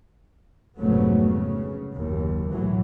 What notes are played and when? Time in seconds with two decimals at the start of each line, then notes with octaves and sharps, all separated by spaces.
0.77 F1 G#2 C#3 F#3 A3 B3
1.21 C#3
1.94 F#1 D#2
2.49 B1 A2 E3 F#3